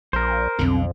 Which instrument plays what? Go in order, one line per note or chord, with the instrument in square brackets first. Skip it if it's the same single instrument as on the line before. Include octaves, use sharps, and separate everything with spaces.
[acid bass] A#1 [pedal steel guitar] A#4 C5
[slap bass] B1 D3 [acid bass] F2 [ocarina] C4